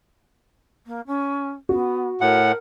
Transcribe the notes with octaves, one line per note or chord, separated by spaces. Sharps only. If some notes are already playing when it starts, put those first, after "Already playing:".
A#3
C#4
B3 F#4
A2 A#4 F#5